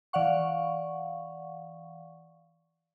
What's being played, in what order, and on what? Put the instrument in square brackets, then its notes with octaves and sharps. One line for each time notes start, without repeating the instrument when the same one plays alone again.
[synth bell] E3 D5 F5 F#5 C#6